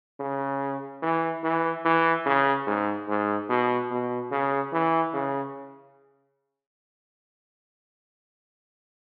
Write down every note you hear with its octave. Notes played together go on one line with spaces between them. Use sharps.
C#3
E3
E3
E3
C#3
G#2
G#2
B2
B2
C#3
E3
C#3